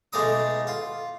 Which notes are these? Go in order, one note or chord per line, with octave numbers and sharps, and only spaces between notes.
B1 G#3 A3 D5 A#5 D#6
F4